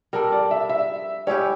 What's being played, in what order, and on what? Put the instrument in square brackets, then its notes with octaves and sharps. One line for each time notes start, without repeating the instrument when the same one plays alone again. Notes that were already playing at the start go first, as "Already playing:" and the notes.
[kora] G3 D4 A4 [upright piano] A#4
[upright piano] D5
E5
E5
[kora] G3 C#4 E4 G4 [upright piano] C#5